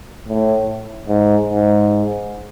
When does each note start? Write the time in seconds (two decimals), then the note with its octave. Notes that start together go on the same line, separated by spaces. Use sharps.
0.28 A2
1.08 G#2
1.48 G#2